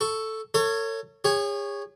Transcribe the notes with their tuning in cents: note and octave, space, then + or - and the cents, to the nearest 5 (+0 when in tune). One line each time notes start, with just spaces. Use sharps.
A4 +0 C#6 +0
A4 +40 C#5 +0
G#4 -40 C#5 +0 C#6 +0